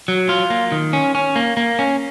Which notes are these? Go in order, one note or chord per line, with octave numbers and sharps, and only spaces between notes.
F#3
F4
A#3
D#3
C#4
C#4
A#3
A#3
C#4